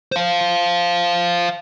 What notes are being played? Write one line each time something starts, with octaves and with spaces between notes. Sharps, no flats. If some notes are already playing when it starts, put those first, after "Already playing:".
C5 F5